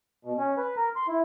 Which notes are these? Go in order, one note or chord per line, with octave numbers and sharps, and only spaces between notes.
B2
C#4
B4
A#4
C6
E4